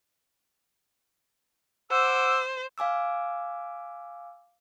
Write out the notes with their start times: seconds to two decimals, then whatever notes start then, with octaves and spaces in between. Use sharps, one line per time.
1.91 C5 F#5 D6 E6
2.78 F5 G#5 D6 E6